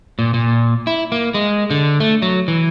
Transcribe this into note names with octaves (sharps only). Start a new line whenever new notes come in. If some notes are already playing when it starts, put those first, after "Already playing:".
A#2
A#2
E4
A#3
G#3
D3
A3
F#3
E3